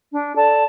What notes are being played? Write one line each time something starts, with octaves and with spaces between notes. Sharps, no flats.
D4
A4 D5 A5